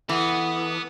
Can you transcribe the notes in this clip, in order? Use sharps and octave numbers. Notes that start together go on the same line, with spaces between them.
E3 B3 A4 F#5 D#6